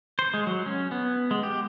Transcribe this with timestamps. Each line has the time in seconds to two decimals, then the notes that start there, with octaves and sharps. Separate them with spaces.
0.19 C5
0.34 G#3
0.47 F#3
0.66 C#4
0.91 B3
1.31 G#3
1.43 G4